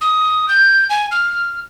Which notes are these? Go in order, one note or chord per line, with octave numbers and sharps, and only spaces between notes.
D#6
G6
G#5
F6